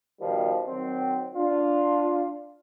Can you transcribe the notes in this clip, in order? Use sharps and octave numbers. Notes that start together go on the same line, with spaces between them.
B2 D#3 F3 G3
D#3 F#3 C4
D4 F4